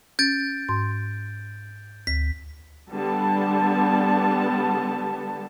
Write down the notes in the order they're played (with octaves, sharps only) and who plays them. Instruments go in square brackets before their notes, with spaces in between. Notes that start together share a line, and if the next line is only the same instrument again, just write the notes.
[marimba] C#4 [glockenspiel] G6 A6 D7
[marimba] G#2 C6
[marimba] D2 [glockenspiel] B6
[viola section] D3 G3 B3 A5